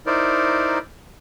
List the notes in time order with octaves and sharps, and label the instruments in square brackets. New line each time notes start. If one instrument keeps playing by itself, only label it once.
[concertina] D#4 E4 A#4 C5 D5